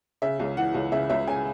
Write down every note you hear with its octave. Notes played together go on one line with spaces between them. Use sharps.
C#3 E5
C#2
E3 F#5
C#2
C#3 E5
C#2 E5
C#3 G#5